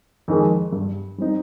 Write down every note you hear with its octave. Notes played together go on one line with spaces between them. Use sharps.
F2 D#3 G#3
G2
G3 C4 D#4